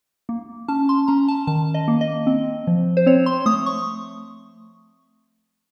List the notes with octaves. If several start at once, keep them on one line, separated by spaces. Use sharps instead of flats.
A#3
C#4 A5
C6
C#4 A#5
A5
D#3 A5
D#5
A#3
D#5
C4
F3
C5
C4 C#5
C6
A3 D#6
C#6